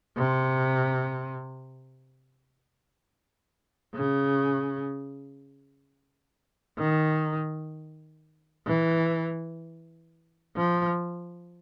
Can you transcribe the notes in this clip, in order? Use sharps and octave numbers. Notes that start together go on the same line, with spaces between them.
C3
C#3
D#3
E3
F3